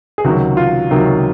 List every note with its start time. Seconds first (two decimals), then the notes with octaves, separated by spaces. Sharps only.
0.18 G#4
0.24 C#2 C3 D#3 F#3 F#4
0.57 F4
0.91 C#2 C3 D#3 F#3